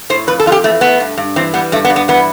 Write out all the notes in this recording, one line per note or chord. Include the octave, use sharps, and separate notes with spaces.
A2 C5
F2 B4
A4
F2 F4
G4
E3 A3
A3 B3
G2
G2
E3 C4
G3 B3
G2 A3
B3
G2
B3
E3 B3